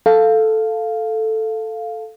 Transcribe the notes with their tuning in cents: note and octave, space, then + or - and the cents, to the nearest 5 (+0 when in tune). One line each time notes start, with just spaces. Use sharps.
A4 +0 F5 +0